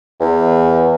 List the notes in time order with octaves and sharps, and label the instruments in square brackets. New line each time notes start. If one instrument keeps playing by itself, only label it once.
[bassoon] E2